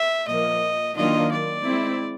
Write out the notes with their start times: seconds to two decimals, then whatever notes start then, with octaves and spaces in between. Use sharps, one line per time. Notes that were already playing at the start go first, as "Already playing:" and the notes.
Already playing: E5
0.27 A#2 F3 A#3 D#5
0.96 D#3 F#3 A#3 D4 F4 D#5
1.31 D5
1.65 G#3 C4 E4